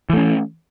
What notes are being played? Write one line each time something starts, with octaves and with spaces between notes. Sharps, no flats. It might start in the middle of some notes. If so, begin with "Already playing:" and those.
E3 A3 C#4